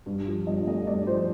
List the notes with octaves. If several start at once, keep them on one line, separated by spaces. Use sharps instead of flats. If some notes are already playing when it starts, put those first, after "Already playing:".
G2
F3
G2 D#5
A3 D#5
G2 D5
F3 C5